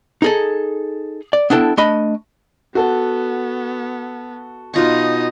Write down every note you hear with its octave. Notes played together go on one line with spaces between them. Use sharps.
D#4 G#4 A4
D5
B3 D4 E4 A4 G5
A3 D4 D#5 B5
B3 F#4 A4
B2 D#4 F4 D#5 C#6